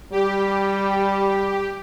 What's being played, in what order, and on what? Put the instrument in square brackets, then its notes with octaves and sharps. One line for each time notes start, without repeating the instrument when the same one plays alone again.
[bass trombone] G3 [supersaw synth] G4